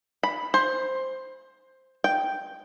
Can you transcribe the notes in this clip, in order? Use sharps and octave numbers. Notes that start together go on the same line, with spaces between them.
B5
C5
G5